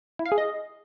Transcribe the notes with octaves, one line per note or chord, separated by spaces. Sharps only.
E4
F5
G#4
D#5